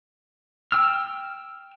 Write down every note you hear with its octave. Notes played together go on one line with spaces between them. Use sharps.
G5 E6 F6